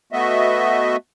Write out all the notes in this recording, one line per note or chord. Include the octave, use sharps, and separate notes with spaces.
A3 B3 F#4 D#5 E5